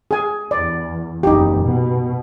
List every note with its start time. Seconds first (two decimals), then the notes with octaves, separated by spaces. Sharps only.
0.11 G#4 G#5
0.51 E2 D5
1.23 F#1 E2 D#4 G4
1.61 B2